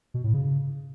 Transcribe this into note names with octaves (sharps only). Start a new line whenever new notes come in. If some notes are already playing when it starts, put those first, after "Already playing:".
B2
A2
C#3